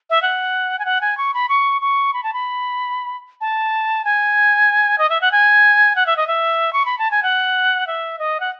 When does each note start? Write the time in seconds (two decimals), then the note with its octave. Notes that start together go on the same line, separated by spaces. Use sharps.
0.10 E5
0.22 F#5
0.79 G#5
0.85 F#5
1.01 G#5
1.18 C#6
1.34 B5
1.49 C#6
1.81 C#6
2.14 B5
2.23 A5
2.34 B5
3.41 A5
4.05 G#5
4.98 D#5
5.10 E5
5.21 F#5
5.32 G#5
5.96 F#5
6.06 E5
6.17 D#5
6.27 E5
6.73 C#6
6.85 B5
6.99 A5
7.11 G#5
7.23 F#5
7.87 E5
8.19 D#5
8.40 F#5